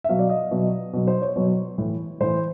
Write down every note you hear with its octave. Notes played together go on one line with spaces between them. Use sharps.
E5
B2 F#3 F5
D5
D#5
B2 F#3
B2 F#3
C5
C#5
B2 F#3 C#5
A2 E3
A2 E3 C5